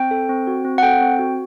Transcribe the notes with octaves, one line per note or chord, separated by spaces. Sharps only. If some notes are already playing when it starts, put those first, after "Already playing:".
Already playing: C4 G5
A4
C4
F#4
C4
F#5
A4 G5
C4
F#4